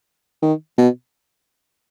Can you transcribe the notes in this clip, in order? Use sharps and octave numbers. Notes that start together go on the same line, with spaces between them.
D#3
B2